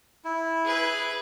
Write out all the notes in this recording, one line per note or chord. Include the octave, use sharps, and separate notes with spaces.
E4
G#4 B4